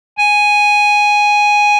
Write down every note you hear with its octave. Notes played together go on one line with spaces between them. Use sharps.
G#5